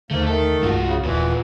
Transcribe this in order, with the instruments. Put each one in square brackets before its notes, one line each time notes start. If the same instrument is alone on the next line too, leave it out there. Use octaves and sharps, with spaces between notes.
[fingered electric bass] D#2 D3 [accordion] G#2 A#3 [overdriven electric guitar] A3
[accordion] D#3 A3 [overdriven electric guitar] A4
[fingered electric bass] C2 G2 G#3 [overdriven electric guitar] F4 F#4
[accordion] C#3
[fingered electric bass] D#1 [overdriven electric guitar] A#2 B3 [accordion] E3